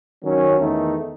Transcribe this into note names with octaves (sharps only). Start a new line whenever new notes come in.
D#3 F#3 C#4
E2 D#3 A3 D#4